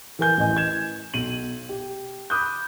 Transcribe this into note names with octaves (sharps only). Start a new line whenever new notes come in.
E3 A#4 G#5 G6
A1 E3 D#5 G#5
G#6 E7
B1 D#7 F#7
G4
B5 D6 D#6 F#6 G6